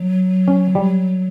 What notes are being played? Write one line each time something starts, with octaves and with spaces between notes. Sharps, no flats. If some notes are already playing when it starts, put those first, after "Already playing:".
Already playing: F#3
C#4
G3